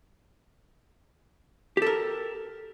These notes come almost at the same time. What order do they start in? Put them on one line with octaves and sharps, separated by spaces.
G4 A4 A#4